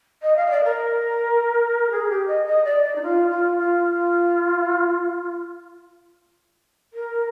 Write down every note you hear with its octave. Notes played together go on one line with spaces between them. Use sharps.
D#5
F5
D#5
D5
A#4
G#4
G4
D#5
D#5
D5
D5
D#4
F4
F4
F4
A#4